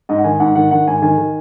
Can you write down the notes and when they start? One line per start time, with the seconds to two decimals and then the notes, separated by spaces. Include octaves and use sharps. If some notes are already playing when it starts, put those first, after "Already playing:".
0.09 G#2 D#5
0.18 F#5
0.24 D#3 G#5
0.40 G#2 F#5
0.55 D#3 F#5
0.71 D#3 F#5
0.87 G#2 G#5
1.02 D#3 G#5
1.18 D#3